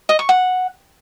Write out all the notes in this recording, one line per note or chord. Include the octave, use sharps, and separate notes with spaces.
D#5
C#6
F#5